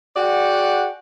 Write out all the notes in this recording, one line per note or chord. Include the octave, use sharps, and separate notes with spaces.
F#4 G#4 D5 F#5 G5